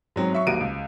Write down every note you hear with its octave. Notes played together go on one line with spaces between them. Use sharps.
G#2 F#3 C4
F#3 E5 C#6
D#1 A#1 A#3 F#4 D7 D#7
C#2